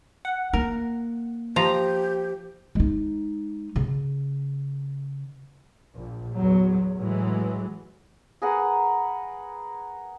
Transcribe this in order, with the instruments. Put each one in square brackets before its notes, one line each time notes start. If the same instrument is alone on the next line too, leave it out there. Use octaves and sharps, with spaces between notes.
[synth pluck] F#5
[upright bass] A#3 [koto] A#4
[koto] F3 A#5 [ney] G4
[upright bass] G#3 D#4
C#3
[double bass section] A#1
E2 F#3
A2 E3 F#3 G#3
[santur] G#4 A#4 B4 F#5